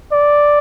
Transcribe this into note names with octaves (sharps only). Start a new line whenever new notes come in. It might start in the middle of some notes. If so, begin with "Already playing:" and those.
D5